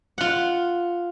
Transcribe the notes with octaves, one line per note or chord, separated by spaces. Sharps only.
F4 F#5